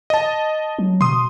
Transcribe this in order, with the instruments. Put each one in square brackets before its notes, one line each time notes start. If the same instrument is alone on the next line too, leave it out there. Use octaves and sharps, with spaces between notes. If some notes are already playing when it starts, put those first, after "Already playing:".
[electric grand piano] D#5 A5
[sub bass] F#3
[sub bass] B2 [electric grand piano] C6 D#6